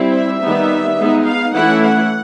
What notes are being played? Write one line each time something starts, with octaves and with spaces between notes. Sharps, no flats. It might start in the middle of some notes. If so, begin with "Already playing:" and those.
Already playing: G3 C4 E4
E5
D#3 G3 B3 D#4
G#3 B3 D#4
F5
E3 A3 C#4 E4 F#5
F#5